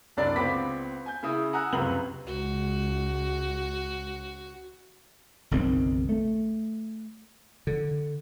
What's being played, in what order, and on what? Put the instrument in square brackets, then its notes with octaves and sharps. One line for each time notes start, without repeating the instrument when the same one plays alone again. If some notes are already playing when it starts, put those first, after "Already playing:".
[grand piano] C2 F#2 D4 D5
C#2 B3 C4 B5 D6 B6
G#5 G6
C#3 E4 D#6
F#5 G#5 A#5 D#6 E6 F#6
F1 C#2 F#2 C3 B4 F#7
[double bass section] C#2 [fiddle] F#4
[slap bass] F#1 B1 D#3 C4
A3
D3